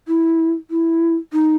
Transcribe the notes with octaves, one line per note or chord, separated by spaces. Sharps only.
E4
E4
D#4